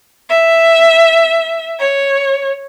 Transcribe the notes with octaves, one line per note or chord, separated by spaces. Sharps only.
E5
C#5